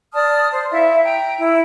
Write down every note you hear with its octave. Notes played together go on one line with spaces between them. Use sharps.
D5 A5 D#6 F6
C5
E4 E5 F5
G5 A#5
E4